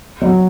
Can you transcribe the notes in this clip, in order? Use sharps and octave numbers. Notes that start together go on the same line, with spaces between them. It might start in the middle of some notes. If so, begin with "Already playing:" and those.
F#3